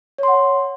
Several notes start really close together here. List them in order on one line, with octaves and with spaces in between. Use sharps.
C#5 C6 F#5